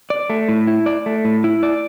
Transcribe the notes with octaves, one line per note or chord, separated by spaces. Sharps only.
D5
A3
A2
E4
D5
A3
A2
E4
D5